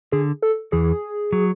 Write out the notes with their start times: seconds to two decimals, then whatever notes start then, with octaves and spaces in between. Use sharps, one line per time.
0.12 D3 G#4
0.42 A4
0.72 E2 E3 G#4
1.33 F#3